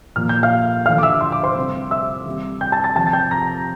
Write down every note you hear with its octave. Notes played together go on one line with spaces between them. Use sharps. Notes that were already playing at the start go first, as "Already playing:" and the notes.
A#2 F3 A#3 F6
G6
F5 F6
D3 F3 A3 F5 F6
D6
E5 E6
C6
D6
C5 C6
C3 G3 C4
E5 E6
C3 G3 C4
G5 G6
A5 A6
A5 A6
C3 F3 C4 A5 A6
A6
G5 G6
A#5 A#6